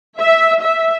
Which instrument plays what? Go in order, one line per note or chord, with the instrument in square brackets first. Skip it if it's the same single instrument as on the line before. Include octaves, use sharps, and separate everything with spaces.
[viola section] E5
E5